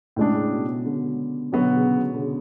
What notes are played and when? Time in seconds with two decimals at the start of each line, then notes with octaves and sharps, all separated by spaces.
0.16 A2 C#3 G#3 D4
0.34 C#3
0.51 B2
0.68 B2
0.85 B2 D3
1.52 B2 D3 F#3 B3 F#4
1.76 C#3
1.98 B2
2.14 D3
2.21 C#3